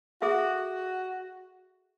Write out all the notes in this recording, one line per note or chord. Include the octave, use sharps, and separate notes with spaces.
F#4 G#4 A4 E5